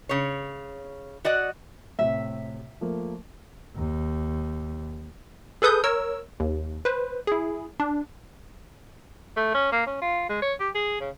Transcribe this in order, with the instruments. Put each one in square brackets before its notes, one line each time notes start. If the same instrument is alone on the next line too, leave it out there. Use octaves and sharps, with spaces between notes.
[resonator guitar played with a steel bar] C#3 C#5
F#4 D5 D#5 F#5
[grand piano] A2 C3 [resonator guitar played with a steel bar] E5
[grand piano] F3 A3 A#3
[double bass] D#2
[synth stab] G#4 A4 B4 D#6 G6
A#4 C#5 E6
D#2
B4 C5
E4 G#4
D4
[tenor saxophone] A3
C#4
A#3
C#4
F4
G#3
C#5
G4
G#4
C#3